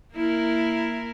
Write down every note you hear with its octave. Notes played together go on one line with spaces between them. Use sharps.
A#3 E4 A#4